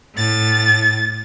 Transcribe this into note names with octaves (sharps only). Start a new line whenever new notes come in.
A2 A6